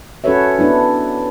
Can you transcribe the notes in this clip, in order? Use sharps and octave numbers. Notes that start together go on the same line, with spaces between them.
C#4 F#4 A4 B4 C#5 E5
B3 D4 E4